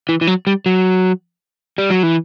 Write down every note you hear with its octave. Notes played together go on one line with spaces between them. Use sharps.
E3
E3
F#3
G3
F#3
G3
F#3
E3